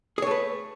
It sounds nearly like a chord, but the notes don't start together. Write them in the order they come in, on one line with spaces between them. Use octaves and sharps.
G#4 C#5 A3 B4